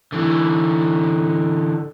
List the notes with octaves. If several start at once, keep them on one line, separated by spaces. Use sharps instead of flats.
D3 E3